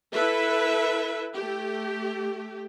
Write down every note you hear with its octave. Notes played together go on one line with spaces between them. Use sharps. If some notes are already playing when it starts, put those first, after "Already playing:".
E4 A4 B4 E5
A3 G4